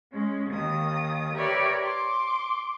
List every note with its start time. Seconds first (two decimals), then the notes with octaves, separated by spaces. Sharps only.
0.13 G#3 C#4
0.51 D#2 D#3 D#6
1.37 G4 A#4 B4 C#5 D5 E5
1.81 C6 D6